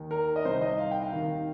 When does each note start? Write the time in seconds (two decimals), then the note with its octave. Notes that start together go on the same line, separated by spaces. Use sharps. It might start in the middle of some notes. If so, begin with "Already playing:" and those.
Already playing: D#2 D#3
0.11 A#4
0.36 D#5
0.44 C2 C3 D#3 C5
0.61 D#5
0.78 F5
0.91 G5
1.03 F5
1.13 D#2 D#3